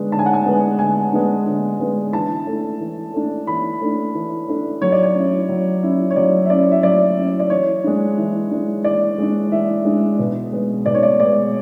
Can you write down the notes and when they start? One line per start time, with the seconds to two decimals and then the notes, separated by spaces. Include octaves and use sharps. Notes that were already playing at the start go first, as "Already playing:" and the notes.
Already playing: D3 G#3 B3 D4
0.12 D3 A5
0.19 G#5
0.26 F#5
0.33 G#5
0.46 G#3 B3 D4
0.79 D3 G#5
1.12 G#3 B3 D4
1.46 D3
1.80 G#3 B3 D4
2.13 E3 A5
2.47 A3 D4
2.80 E3
3.14 A3 D4
3.47 E3 B5
3.81 A3 D4
4.15 E3
4.48 A3 D4
4.82 F#3 C#5
4.92 D5
5.03 C#5
5.15 C#4 E4
5.49 F#3
5.82 C#4 E4
6.11 C#5
6.16 F#3 D5
6.45 E5
6.50 C#4 E4 D5
6.71 E5
6.83 F#3 D5
7.16 C#4 E4
7.40 D5
7.50 E3 C#5
7.84 G#3 D4
8.18 E3
8.51 G#3 D4
8.84 E3 D5
9.18 G#3 D4
9.52 E3 E5
9.85 G#3 D4
10.19 B2
10.52 G#3 B3
10.86 B2 D5
10.95 C#5
11.03 D5
11.20 G#3 B3 D5